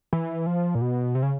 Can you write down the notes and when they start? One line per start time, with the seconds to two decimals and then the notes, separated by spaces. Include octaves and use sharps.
0.13 E3
0.46 F3
0.75 A#2
0.81 B2
1.15 C3
1.23 C#3